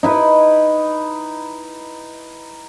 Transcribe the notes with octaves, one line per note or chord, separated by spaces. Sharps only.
D#4 E4 B4 D#5